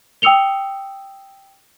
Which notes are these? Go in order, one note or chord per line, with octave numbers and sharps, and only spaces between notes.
G5 D#6 E6 C#7 F7 G7